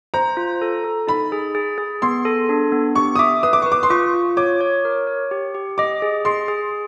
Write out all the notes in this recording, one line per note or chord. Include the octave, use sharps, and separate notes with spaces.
C5 A#5
F4
A4
A4
D#4 B5
G#4
G#4
G#4
B3 C6
A4
D4
B3
G4 C#6
D#6
E5 D6
B4 D#6
D6
B4 C#6
D6
C6
F4 C#6
F4
C#5 D6
C#5
A#4
C#5
G4
G4
D#5 D6
G#4
G#4 C6
G#4